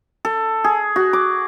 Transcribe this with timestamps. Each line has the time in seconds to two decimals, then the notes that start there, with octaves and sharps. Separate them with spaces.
0.25 A4
0.64 G#4
0.96 F#4
1.13 D6